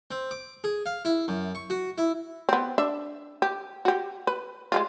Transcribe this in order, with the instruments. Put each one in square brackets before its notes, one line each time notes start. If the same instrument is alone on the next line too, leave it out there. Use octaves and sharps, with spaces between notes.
[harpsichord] C4
D6
G#4
F5
E4
F#2
C#6
F#4
E4
[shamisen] B3 C4
D4 E5
G4
F#4 G4
B4
G#3 A3 F4